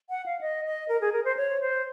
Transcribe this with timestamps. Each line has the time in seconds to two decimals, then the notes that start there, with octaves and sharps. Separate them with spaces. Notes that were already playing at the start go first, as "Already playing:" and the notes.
0.10 F#5
0.26 F5
0.41 D#5
0.65 D#5
0.89 A#4
1.01 G#4
1.12 A#4
1.24 C5
1.37 C#5
1.61 C5